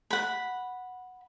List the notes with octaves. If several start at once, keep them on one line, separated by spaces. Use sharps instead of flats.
F#5 B5